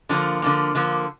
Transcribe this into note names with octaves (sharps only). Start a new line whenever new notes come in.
D3 F3 A#3
D3 F3 A#3
D3 F3 A#3